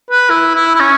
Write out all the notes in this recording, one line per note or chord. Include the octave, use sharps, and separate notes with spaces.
B4
E4
E4
E4
C#4